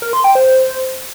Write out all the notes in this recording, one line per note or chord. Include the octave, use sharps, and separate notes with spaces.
A#4
C6
G5
C5